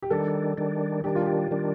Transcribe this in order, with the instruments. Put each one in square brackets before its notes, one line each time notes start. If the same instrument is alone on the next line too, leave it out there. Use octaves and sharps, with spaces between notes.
[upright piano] G4
[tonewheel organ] D#3 G3 D4 [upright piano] A4
[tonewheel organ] D#3 G3 D4
[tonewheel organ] D#3 G3 D4 [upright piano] G4
[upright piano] F4
G4
[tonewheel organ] D#3 G3 D4